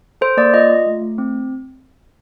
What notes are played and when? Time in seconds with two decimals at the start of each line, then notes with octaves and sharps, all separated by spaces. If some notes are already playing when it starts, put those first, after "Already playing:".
0.21 A4 C5
0.37 A#3 D5
0.54 F4 D#5
0.70 F4
0.86 A3
1.02 A3
1.18 C4